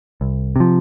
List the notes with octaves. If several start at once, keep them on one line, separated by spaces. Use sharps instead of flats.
C2
C3 F3